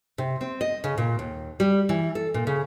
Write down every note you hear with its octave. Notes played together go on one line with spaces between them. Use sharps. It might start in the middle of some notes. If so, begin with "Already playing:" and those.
C3
C4
D#5
C#3
A#2
D#2
G3
E3
A4
A#2
C#3